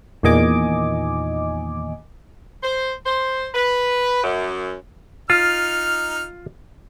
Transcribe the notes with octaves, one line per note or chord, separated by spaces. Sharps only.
E2 A#2 D#3 D#5 G#5 D6
C5
C5
B4
F#2
D#4 F4 F6